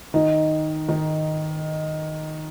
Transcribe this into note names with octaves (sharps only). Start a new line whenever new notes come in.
D#3 D#4
D#3 D#4